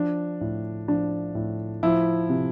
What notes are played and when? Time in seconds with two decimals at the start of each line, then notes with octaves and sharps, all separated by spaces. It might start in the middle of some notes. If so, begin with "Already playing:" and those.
Already playing: F3 D4
0.41 A2
0.88 F3 D4
1.35 A2
1.83 F3 E4
2.29 C3